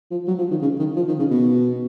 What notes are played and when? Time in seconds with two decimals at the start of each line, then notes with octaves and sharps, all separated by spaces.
0.11 F3
0.27 F#3
0.38 F3
0.51 D#3
0.62 C#3
0.79 D#3
0.96 F3
1.08 D#3
1.19 C#3
1.31 B2